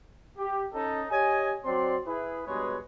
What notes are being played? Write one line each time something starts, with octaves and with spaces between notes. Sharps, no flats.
G4
C#4 D#4 A4
G4 C#5 D#5 G#5
F#3 C4 D4 D5 C6
E4 G#4 B4
G2 B2 G#3 G#4 B4 C#5